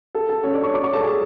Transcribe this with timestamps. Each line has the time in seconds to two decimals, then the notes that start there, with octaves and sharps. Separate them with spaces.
0.15 A4
0.29 A4
0.43 C#4 C#5
0.54 D4 D5
0.63 C#5 C#6
0.73 D5 D6
0.83 C#5 C#6
0.93 A4 A5
1.03 G#4 G#5